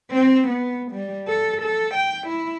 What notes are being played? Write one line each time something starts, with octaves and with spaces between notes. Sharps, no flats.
C4
B3
G3
A4
A4
G5
E4